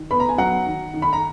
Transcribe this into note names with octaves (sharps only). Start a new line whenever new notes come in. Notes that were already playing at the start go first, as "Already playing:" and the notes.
Already playing: D#3
B3 B5
A#5
G#5
F#3 F#5 A#5
D#3
D#3
B5
A#5